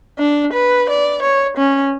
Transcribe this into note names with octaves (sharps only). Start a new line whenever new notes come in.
D4
B4
D5
C#5
C#4